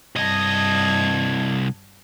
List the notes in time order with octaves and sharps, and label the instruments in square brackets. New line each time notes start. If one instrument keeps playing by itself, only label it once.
[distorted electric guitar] C2 D#5 [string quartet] G2 A5 G#6